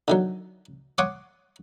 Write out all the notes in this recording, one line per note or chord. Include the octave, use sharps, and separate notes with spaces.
D3 D#3 F#3
C#5 F#5 C6 D6 D#6